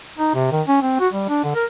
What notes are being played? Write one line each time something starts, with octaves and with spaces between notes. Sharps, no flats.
D#4
C3
D#3
C#4
C4
F#4
G3
D4
D3
A#4